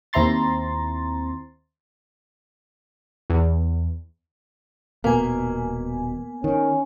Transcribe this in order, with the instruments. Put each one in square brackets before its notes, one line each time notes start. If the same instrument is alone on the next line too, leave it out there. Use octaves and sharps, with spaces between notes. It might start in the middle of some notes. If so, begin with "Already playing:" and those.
[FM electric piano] D#2 C4 E4 A#5 C6 A6
[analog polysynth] E2
[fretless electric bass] D#1 B2 [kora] A#3 [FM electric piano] B3 G#5
[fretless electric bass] D#3 [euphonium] C#4